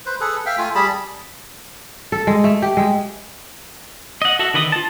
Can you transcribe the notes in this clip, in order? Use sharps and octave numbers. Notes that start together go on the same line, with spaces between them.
B4 C5
G#4 A4 B4
E5 F5 G5
A3 F4 G#5
G3 G#4 A5 B5
A4
G#3
A3
G4
G#3
D#5 F#5
F#4 A4 E5
D3 D#3 B4 D#5 D#6
F4 A5